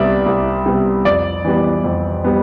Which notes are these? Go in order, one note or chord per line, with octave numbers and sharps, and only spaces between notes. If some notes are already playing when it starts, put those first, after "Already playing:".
Already playing: C2 C3 G3 B3 D5 E5
C2
C3 G3 B3
F2 D5
E3 G3 B3
F2
G3 B3